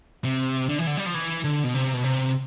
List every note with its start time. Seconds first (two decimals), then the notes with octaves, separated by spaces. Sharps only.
0.25 C3
0.69 D3
0.79 E3
0.87 D3
0.97 G3
1.06 F3
1.14 E3
1.44 D3
1.64 B2
1.74 C3
1.94 B2
2.04 C3